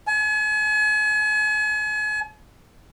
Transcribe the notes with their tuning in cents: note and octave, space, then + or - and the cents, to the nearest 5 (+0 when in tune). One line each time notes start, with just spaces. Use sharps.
G#5 +40